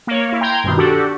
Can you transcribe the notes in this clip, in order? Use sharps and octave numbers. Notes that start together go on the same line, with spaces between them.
A#3 C#5
A#3 E4
G5 A#5 C6 G6 G#6
G2 B2 D#3
D4 F#4 G4 A4